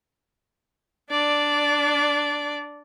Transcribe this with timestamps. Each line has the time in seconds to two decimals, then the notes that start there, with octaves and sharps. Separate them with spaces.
1.10 D4 D5